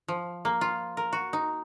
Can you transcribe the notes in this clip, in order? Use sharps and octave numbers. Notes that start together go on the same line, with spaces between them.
F3
A#3
F4
A#4
F#4
D#4